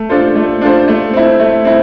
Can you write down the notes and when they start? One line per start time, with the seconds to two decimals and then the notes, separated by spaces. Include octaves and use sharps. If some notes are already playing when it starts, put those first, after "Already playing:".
Already playing: A3
0.09 D4 F4 A4 C5
0.35 A3
0.61 D4 F4 A4 C5
0.88 A3
1.13 C4 E4
1.40 A3
1.65 C4 E4